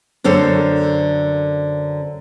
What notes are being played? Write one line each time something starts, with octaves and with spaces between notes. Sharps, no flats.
F#2 D3 A4 C5 C#5